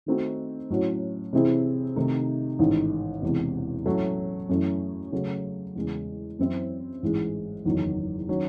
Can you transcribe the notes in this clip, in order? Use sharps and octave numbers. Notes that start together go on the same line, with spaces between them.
D#3 A3 C4 D#4 F#4
A2 F#3 C#4 F#4
C3 E3 C4 E4 G#4
C3 D#3 A3 D#4
A1 G#2 D#3
E1 E2 C3
A2 F#3 A3 C#4
F#2 E3 A3 C#4
C#3 F#3 A3
E2 C#3 G#3
F#2 E3 C4 E4 C5
A1 G#2 E3 G#3
F#1 E2 D#3 F#3
D#3 F#3 C#4